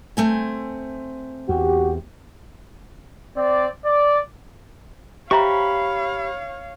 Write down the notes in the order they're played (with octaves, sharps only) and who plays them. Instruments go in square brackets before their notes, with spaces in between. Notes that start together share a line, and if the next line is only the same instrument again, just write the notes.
[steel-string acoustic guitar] A3 C4 G#5
[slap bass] E2 [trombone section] F#4 G4
[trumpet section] C4 D5
D5
[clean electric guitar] G4 [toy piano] C5 E5 A#5 [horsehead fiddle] C#5 F5 [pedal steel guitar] B5 C#6